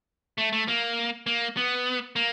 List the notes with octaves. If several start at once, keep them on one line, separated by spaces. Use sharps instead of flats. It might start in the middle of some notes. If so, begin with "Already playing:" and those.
A3
A3
A#3
A#3
B3
A#3